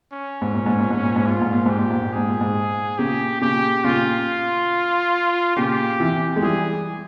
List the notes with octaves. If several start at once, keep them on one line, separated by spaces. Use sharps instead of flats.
C#4
G#2
A#2
G#2
A#2
G#2
A#2
G#2
A#2 F4
G#2
A#2
G#2 G4
A#2
G#2
A#2
G#2 G#4
A#2
G#2
A#2 C#3 G4
A#2 C#3 G4
A#2 C#3 F4
A#2 C#3 G4
C3 E3
G#3
E3 G3 G#4